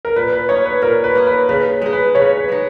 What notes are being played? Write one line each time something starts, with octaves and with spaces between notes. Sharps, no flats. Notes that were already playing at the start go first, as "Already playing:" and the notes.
A#4
A#2 B4
B4
A#3 D#4 C#5
B4
A#2 A#4
B4
A#3 D#4
B4
C#3 B4
G#3 D#4
B4
C#3 C#5
B4
G#3 D#4